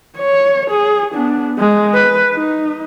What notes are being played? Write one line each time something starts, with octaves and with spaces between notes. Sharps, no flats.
C#5
G#4
B3 D4
G#3
B4
D#4